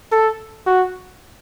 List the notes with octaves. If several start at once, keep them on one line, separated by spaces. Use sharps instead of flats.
A4
F#4